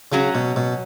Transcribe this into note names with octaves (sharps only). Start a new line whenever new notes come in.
C#3 F#3 C#4 F#4
B2
B2